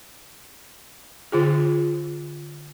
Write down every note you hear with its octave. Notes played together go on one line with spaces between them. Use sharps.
D3 F4 G#4